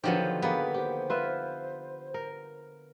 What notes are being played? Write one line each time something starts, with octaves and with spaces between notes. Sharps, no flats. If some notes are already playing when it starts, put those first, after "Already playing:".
D3 D#3 F3 F#3 B3 G4 C5
A#3 B3 G#4 B4
G4 C5
F4 B4 E5
A#4